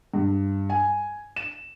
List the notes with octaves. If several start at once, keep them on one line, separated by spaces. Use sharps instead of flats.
G2
G#5
E7